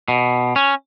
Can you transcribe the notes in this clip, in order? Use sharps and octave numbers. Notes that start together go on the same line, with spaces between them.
B2
C#4